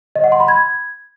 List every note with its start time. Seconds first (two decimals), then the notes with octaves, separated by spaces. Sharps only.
0.16 D#5
0.24 F#5
0.32 C6
0.40 B5
0.48 G#6